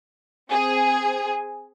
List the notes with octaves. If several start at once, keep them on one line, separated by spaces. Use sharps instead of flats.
C4 G#4